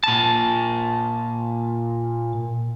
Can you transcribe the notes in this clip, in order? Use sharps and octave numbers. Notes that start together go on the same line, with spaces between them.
A#2 A5